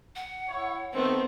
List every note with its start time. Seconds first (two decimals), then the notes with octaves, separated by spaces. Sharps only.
0.16 F#5
0.49 E4 C#5
0.93 D#3 A3 B3 C4